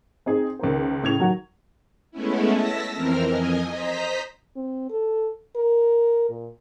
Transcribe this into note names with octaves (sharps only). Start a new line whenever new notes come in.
C4 D#4 G#4
C#2 D#3 A#3 C5
A2 C#3 G#6 F7
D#3 F#3 F#4
G#3 A3 B3 C#4 E4
A5 E6 A#6 B6
F2 E3 C4 A#4 F6
F2 D#5 G#5
C5 D#5 A#5 B6
C4
A4
A#4
A#2